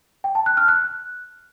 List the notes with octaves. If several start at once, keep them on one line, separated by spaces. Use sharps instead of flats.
G5
A5
F#6
F6
F#6